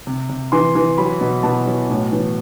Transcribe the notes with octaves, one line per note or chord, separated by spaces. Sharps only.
C3
C3
E3 C6
E3
F#3 B5
B2
B2 A5
F#3
A2
E3